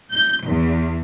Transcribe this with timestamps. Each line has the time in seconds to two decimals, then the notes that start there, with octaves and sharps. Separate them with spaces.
0.12 G6
0.46 E2